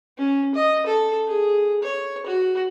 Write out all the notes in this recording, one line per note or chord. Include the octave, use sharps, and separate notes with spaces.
C#4
D#5
A4
G#4
C#5
F#4